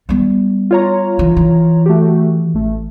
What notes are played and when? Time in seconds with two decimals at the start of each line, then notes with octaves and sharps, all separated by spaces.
0.09 G3 B3
0.71 F4 C#5 A#5
1.19 E3
1.37 E3
1.86 A3 F#4 G4
2.54 A1 A3